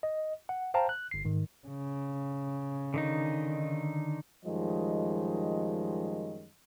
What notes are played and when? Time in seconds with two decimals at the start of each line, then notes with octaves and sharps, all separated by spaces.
0.03 D#5
0.49 F#5
0.74 C5 F5 G5 A5 A#5
0.89 F#6
1.11 G1 C7
1.25 G#2 D#3
1.67 C#3
2.94 D3 D#3 D#4
4.45 F#2 D#3 F3 G3 G#3 D#5